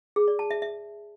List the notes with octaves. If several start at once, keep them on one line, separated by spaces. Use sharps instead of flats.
G#4
D5
A5
E5
E5